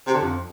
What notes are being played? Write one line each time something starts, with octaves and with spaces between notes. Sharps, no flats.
C3
D3
F2